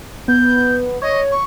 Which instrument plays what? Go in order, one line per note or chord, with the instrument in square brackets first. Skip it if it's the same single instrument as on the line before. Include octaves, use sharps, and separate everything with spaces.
[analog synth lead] B3 [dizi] G6
[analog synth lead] C#5 [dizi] D#5
[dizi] C#6